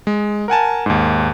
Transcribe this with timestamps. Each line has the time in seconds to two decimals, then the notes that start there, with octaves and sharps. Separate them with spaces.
0.07 G#3
0.48 A#4 F#5 G#5 A5
0.86 D#2 G#2